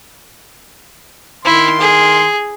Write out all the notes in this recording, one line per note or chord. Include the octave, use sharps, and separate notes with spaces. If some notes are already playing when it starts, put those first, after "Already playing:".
D#3 E4 C6
G#4